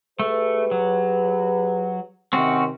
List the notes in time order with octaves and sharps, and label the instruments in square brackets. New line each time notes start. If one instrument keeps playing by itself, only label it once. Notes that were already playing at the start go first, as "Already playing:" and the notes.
[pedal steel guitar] A3 [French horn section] G4 G#4 B4
[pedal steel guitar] F#3
[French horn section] C3 D#3 [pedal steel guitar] C4 C#4 F#4